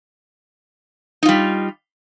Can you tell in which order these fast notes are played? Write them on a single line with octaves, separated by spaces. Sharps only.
D#4 F4 G3